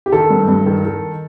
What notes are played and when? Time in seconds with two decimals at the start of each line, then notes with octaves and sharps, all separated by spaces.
0.06 G4
0.12 D#3 A4
0.30 G2
0.48 G2
0.66 D#3
0.85 D#3